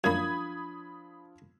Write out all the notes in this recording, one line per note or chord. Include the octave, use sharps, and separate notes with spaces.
F#2 F3 A#3 D4 B5 D#6 G#6